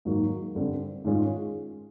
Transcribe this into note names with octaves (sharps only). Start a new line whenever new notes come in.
G#2 D#3 F#3 A#3
G2 D3 G3 C4
G#2 D#3 G#3 C#4 F4